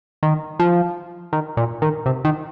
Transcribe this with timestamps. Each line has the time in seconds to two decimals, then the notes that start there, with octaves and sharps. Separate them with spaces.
0.23 D#3
0.59 F3
1.33 D#3
1.57 A#2
1.82 D#3
2.06 C3
2.25 D#3